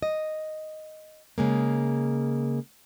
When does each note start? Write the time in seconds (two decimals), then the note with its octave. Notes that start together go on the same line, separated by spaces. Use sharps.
0.02 D#5
1.38 C#3 G#3 A#3